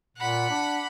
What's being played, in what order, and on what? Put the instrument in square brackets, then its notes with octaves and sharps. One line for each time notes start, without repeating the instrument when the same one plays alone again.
[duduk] A#2 [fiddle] F#5 B5
[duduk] D4